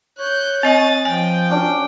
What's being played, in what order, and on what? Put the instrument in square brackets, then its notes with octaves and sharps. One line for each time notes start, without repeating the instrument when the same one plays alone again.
[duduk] C#5 [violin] F#6 G6
[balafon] C4 D#5 G#5 [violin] D#6 A6
[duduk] F3 [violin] G5 [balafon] G#5
[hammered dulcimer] C#4 D4 F#4